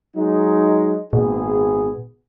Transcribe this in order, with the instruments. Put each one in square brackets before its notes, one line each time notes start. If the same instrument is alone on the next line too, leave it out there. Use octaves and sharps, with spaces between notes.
[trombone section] F#3 G#3 D#4
[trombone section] G#1 B3 G#4 [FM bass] A#2